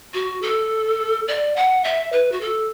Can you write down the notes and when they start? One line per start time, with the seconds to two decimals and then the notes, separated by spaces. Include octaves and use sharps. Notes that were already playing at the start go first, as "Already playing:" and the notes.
0.14 F#4
0.42 A4
1.28 D5
1.56 F#5
1.84 E5
2.12 B4
2.32 F#4
2.41 A4